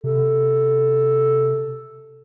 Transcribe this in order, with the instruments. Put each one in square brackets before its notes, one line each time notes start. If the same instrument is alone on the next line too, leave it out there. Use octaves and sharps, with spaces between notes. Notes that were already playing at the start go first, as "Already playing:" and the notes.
[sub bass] C3 [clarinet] A4